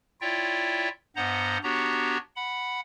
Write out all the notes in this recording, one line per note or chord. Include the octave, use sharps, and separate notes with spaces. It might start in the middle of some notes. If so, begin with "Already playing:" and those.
E4 F4 C#5 D5 E5 G5
G2 B3 C5 D#5 F#5 A#5
B3 D4 F#4 G4 C#5 A#5
F#5 B5